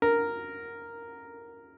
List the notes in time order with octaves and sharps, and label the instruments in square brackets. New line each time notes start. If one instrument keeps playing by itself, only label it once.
[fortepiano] A#4